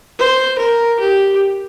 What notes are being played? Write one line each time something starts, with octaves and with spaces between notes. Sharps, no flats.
C5
A#4
G4